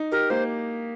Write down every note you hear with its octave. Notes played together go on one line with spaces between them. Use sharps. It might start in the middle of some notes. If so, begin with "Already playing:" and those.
Already playing: D#4
G4 A#4
A#3 C5